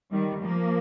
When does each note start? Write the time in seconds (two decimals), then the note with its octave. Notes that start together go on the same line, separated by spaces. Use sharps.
0.12 D#3 G3
0.41 F3 A#3